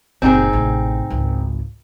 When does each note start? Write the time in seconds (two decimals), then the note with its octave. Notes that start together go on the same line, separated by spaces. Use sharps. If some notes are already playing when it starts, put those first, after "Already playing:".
0.22 F#1 A#2 C4 D#4 G#4
0.53 A1 C3
1.10 G#1 C#2